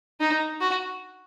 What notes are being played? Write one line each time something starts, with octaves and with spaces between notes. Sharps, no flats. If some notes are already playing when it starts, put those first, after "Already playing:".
D#4
F#4